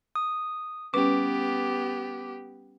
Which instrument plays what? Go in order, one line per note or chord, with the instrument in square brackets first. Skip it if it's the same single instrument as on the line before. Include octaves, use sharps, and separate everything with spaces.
[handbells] D#6
[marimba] G3 C#4 B4 [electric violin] B3 G4 [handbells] D6